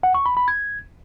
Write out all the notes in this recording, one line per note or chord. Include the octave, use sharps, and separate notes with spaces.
F#5
C#6
B5
B5
G#6